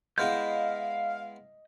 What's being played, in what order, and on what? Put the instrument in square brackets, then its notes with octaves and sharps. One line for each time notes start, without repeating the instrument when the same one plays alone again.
[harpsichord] G#3 B3 E4 [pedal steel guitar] D#5 G6 [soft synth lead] F5